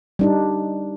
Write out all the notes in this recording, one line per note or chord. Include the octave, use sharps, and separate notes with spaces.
G3 D4 D#4